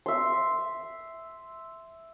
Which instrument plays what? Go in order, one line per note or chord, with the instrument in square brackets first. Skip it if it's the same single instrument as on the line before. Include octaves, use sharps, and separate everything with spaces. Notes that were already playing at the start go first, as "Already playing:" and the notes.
[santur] E5 C6